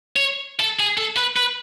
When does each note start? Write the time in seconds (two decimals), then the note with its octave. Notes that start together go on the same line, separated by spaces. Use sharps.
0.16 C#5
0.60 A4
0.80 G#4
0.98 A4
1.17 B4
1.36 B4